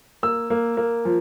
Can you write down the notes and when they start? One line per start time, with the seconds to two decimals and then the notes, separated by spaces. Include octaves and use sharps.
0.23 A#3 E6
0.50 A#3
0.77 A#3
1.05 F3